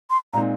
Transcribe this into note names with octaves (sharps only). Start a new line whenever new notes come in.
C6
A#2 G#3 C4 D#4 A#5